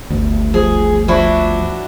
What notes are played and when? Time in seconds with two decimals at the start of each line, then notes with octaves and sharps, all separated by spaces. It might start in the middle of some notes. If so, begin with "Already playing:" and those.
0.10 G1 D2
0.54 F3 G#4
1.08 F3 D4 E4 F#4